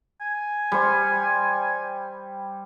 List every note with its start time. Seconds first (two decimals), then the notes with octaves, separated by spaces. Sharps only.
0.21 G#5
0.72 G3 C5